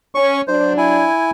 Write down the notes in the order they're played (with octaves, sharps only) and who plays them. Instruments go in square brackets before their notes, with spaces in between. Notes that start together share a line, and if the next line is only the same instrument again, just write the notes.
[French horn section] C#4 [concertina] C#6
[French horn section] F#3 D4 [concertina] C5
[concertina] E4 G#5